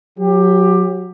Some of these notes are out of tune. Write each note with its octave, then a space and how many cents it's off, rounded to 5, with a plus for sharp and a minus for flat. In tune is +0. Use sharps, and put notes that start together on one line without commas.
F#3 -20 G4 +15